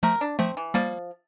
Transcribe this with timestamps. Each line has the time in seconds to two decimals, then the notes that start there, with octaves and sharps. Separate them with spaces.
0.03 F3 A3 A#4
0.21 D4
0.39 F3 A3 C4
0.57 E3
0.74 F3 G3 A#3